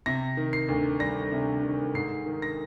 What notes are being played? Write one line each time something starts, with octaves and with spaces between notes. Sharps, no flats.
C3 A#6
D#3
C7
D2
G3 A#6
C3
D#3
G#2 C7
D#3
A#6